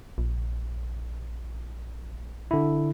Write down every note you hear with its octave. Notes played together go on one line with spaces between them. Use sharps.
A#1
D3 E4